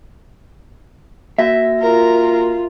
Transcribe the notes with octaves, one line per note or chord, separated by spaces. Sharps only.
A#3 F#4 E5 A#6
F4 A#4